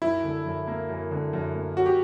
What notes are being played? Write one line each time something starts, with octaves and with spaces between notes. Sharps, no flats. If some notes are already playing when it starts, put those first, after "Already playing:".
F#2 E4
D3
F#2
A#3
F#2
D3
F#2
A#3
C#4 F#4
G4